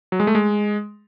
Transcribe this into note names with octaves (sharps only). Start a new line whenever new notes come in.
F#3
G#3
A3
G#3